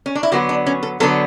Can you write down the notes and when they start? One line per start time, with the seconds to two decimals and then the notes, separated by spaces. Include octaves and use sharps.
0.06 C#4
0.15 D4
0.23 E4
0.32 D3 F#3 B3 F#4
0.49 D4
0.67 C#4
0.83 A4
1.00 D3 F#3 B3 A4